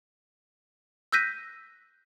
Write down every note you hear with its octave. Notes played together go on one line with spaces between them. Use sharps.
E6 F#6 G6 A#6 B6 D#7